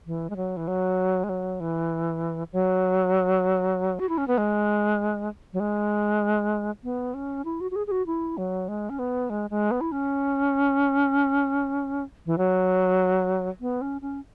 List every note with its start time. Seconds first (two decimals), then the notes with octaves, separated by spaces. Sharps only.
0.06 E3
0.30 G#3
0.37 F#3
0.57 E3
0.68 F#3
1.24 G#3
1.29 F#3
1.60 E3
2.53 F#3
3.99 F#4
4.09 E4
4.18 C#4
4.28 B3
4.38 G#3
5.53 F#3
5.60 G#3
6.84 B3
7.14 C#4
7.45 E4
7.61 F#4
7.71 F#4
7.76 G#4
7.87 G#4
7.91 F#4
8.07 E4
8.37 F#3
8.68 G#3
8.90 C#4
8.99 B3
9.30 G#3
9.50 G#3
9.71 B3
9.81 E4
9.92 C#4
12.26 E3
12.38 F#3
13.61 B3
13.81 C#4
14.02 C#4